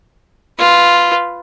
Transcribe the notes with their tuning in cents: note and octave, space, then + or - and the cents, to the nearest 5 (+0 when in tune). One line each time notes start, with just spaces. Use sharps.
F4 +0 B4 +5